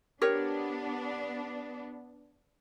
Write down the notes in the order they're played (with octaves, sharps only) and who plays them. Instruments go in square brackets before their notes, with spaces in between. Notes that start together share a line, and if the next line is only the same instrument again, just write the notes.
[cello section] B3 D4 [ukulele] G4 A#4 C#5